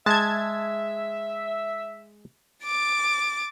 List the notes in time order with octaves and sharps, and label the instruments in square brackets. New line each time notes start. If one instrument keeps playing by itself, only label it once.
[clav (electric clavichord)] G#3 [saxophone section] E5 [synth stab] A5 G#6
[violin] D6 A6